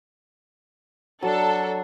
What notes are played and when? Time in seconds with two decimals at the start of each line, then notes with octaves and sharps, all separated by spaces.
1.23 F#3 D4 A4